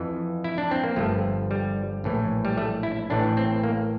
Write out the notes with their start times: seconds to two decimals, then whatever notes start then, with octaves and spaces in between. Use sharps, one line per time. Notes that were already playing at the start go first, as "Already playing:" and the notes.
Already playing: F2 E3
0.44 E4
0.58 D4
0.71 C4
0.84 A#3
0.96 G1 G2 F3 A3
1.51 G3
2.04 A#1 A2 E3
2.45 G3
2.58 A3
2.83 E4
3.10 A1 A2 E3 D4
3.37 C4
3.64 A#3